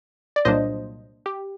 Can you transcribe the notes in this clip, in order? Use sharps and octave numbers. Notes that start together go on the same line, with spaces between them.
D5
C2 A#2 F#3 A#3 D4 C5 D#5
G4